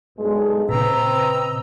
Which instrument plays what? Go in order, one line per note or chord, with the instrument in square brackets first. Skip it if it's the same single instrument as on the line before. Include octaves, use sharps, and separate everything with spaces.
[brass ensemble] B1 G2 G#3
[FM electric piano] A#2 C#3 [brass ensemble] C4 B4 [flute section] D#5 A#5 E6